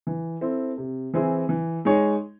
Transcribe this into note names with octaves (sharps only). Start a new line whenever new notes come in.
E3
C4 E4 A4
C3
E3 C4 E4 G#4
E3
G#3 D#4 G#4 C#5